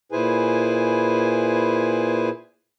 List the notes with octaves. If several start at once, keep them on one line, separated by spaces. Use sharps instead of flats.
A#2 E4 G#4 B4 C5 G#5